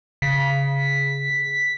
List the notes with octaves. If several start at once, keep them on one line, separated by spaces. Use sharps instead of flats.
C#3 B6